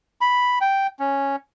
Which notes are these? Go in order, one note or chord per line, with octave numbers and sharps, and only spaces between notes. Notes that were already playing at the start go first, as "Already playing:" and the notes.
B5
G5
C#4